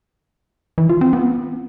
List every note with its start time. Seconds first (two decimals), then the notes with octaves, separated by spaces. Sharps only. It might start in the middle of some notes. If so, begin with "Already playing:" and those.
0.78 E3
0.89 F4
1.01 C4
1.13 B3